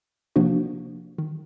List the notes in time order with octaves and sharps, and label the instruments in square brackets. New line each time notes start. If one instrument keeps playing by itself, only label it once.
[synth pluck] C3 F3 A#3 D4 F#4
D#3